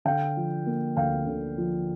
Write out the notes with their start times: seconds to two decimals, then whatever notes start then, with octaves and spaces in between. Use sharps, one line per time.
0.05 D3 F5 G5
0.37 F3
0.66 A#3
0.96 D2 F5 G5
1.27 D3
1.58 F3